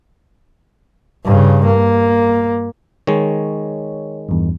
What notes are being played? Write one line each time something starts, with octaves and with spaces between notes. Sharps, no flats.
G2 C#3
A#3
D#3 G#3 C#5
E2 G2